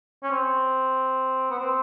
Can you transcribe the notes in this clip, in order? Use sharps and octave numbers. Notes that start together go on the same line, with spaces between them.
C#4
C4
B3
C4